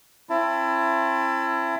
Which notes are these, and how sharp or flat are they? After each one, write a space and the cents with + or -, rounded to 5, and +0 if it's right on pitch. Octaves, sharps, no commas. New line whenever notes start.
C4 +35 E4 +30 A5 +20